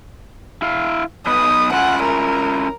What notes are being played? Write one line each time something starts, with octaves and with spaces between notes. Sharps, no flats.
E4 F5
B3 D#4 B4 D#6
C#4 E4 F4 F#5
A#4